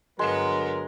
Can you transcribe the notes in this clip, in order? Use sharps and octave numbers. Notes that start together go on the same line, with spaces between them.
G2 D3 F#3 G#3 B3 A#4